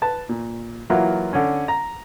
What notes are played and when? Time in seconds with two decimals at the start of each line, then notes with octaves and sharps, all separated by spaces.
0.02 B4 A5
0.29 A#2
0.90 E3 F#3 A#3 E4 F4
1.33 D3 C#4
1.68 A#5